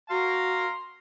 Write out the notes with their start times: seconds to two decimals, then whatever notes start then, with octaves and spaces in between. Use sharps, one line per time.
0.10 F#4 F5 A#5 C6